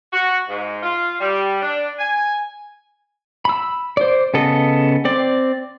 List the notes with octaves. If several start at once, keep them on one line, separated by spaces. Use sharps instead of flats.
F#4
G#2
F4
G3
D4
G#5
B5 E6
C5 D5
C#3 B3 A4 D#5
C4 D5